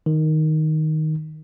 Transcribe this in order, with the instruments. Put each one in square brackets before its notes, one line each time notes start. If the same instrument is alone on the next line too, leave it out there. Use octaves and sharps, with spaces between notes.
[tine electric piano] D#3